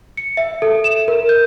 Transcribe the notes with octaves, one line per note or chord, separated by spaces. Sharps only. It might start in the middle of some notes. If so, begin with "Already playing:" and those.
C#7
E5
A4
E7
A#4
G6